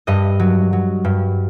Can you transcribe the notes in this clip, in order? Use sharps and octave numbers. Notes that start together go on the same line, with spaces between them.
G2 D#5
F#3
F#3
G2